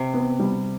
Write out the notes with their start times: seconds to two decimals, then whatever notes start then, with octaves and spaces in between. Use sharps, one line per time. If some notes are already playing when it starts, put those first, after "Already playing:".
Already playing: C3
0.14 B3
0.40 G3